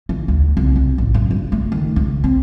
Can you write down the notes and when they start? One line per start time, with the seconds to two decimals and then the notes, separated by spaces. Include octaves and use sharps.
0.09 E3
0.28 D2
0.57 C2
0.76 C4
0.98 A1
1.14 F#2
1.31 G2
1.52 A3
1.72 D#3
1.96 C#2
2.24 C4